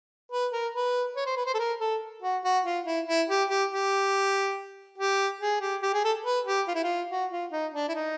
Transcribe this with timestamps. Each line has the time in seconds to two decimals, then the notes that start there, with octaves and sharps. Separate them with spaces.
0.32 B4
0.53 A#4
0.75 B4
1.16 C#5
1.26 C5
1.36 B4
1.46 C5
1.54 A4
1.59 A#4
1.80 A4
2.22 F#4
2.44 F#4
2.65 F4
2.86 E4
3.07 E4
3.29 G4
3.49 G4
3.71 G4
4.98 G4
5.41 G#4
5.61 G4
5.82 G4
5.94 G#4
6.04 A4
6.25 B4
6.46 G4
6.68 F4
6.75 E4
6.83 F4
7.10 F#4
7.31 F4
7.52 D#4
7.74 D4
7.88 E4
7.95 D#4